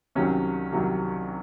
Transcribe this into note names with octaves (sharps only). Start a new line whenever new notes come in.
C2 C3 D#3 F#3 C#4
C2 C3 D#3 F#3